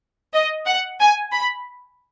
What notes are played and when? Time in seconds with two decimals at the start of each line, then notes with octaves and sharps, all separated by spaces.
0.34 D#5
0.66 F#5
0.99 G#5
1.32 B5